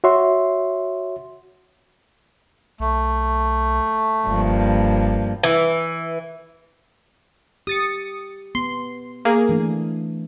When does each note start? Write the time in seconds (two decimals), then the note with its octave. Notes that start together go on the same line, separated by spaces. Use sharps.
0.04 F#4 C#5 E5 C6
2.80 B1 A3
4.27 F#1 G2 F3 A#3
5.43 E3
7.67 G4 D#6 A6 C#7
8.55 B3 C6
9.25 A#3 G#4
9.49 E3 A3 D4